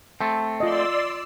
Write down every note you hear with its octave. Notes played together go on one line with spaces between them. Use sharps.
A3 C4 A5
F4 D5 D#5 C6 E6